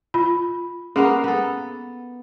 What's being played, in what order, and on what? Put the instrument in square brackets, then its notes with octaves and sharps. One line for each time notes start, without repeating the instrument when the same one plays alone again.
[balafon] F4 B5
[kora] A#3 B3 F5 [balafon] C#4 G#4
[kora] B3 A4